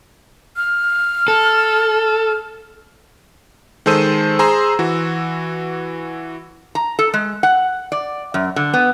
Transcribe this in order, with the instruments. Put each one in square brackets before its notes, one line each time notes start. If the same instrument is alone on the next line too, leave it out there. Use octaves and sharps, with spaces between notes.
[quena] F6
[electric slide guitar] A4
[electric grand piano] D#3 G#3 A4 C5 E6 D#7
G#4 C5 A#5 C6 E6
E3 F#4
[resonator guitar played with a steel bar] A#5
A4
G#3
F#5
D5
F#2
D3
B3